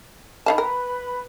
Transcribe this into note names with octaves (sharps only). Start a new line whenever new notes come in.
D#3 B4 F5 A5 B5
A#4